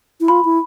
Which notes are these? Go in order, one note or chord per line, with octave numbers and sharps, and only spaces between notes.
E4
F4 B5
E4